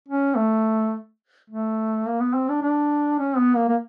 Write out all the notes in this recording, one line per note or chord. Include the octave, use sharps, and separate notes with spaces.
C#4
A3
A3
A#3
B3
C4
D4
D4
C#4
B3
A#3
A#3